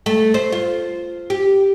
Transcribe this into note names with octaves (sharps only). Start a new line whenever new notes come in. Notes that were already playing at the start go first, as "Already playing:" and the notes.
A3
C5
F4
G4